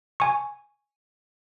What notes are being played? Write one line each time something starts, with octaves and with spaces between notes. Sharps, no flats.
G#5 C#6